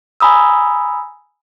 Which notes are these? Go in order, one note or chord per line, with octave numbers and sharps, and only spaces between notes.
G#5 A#5 B5 D#6 E6